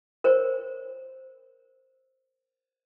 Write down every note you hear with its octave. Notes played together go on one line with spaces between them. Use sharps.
A#4 C5 C#5